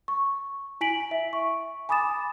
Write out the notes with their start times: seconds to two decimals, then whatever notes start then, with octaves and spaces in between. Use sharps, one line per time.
0.08 C#6
0.81 E4 G#5 B6 D7 F#7
1.11 E5
1.33 C#6
1.89 G#5 B5 D6 D#6 A6 E7